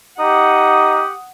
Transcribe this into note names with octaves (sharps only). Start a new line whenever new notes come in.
D#4 G4 F#5 D#6